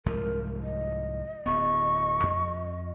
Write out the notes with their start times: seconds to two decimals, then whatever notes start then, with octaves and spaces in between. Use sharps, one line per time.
0.06 C2 G#2 F3 A#4
0.63 D#5
1.46 D1 B3 C#6
2.23 F2